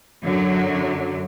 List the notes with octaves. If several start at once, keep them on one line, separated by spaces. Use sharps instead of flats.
F#2 D3 F#3